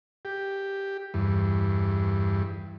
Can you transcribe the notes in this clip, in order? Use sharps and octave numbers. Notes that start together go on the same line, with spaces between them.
G4
E2 G2